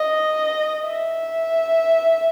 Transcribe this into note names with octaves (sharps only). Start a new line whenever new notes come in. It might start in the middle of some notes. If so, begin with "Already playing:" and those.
Already playing: D#5
E5